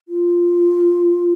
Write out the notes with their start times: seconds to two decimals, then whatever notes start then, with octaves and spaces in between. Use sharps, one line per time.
0.08 F4